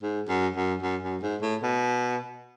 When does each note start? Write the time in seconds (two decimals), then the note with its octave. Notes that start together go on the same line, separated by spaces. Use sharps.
0.03 G#2
0.29 F#2
0.56 F#2
0.83 F#2
1.03 F#2
1.23 G#2
1.42 A2
1.63 B2